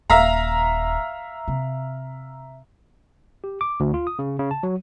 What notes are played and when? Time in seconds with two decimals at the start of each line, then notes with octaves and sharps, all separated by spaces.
0.10 D#1 E5 F5 A#5
1.48 C3
3.44 G4
3.61 D6
3.80 D2
3.94 F4
4.07 D#6
4.19 C#3
4.39 C#3
4.51 A5
4.63 F#3